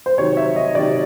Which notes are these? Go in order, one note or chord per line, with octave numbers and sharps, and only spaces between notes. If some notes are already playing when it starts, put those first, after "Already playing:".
C5
C3 D#3 F#3 C#5
E5
D#5
C3 D#3 F#3 D5